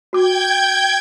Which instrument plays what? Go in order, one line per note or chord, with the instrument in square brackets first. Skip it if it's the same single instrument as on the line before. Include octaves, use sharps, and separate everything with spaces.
[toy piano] F#4 D6 [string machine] G5 G6 G#6